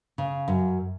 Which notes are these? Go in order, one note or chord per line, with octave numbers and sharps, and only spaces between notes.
C#3
F#2